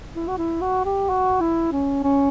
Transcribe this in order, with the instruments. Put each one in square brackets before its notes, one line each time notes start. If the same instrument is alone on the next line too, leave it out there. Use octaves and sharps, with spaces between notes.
[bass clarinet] E4
F#4
E4
F#4
G4
F#4
E4
C#4
C#4